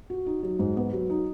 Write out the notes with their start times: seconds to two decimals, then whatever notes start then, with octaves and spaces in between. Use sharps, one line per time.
0.10 F#4
0.26 D#4
0.43 F#3
0.59 G#2
0.77 B3
0.93 F#3
1.10 D#4